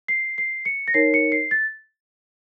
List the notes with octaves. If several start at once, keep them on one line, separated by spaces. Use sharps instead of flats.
C7
C7
C#7
A#6
D#4 A#4 C#5 C7
C#7
C7
A6